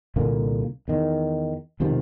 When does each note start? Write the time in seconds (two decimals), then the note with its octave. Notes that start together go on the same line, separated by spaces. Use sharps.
0.16 C2 A#2 D3 A#3
0.88 E2 D#3
1.80 E1 C3 D#3 F3